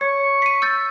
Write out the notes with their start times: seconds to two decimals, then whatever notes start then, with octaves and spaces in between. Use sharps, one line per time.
0.01 C#5 C#6
0.42 B6 D#7
0.62 E6 G6 A6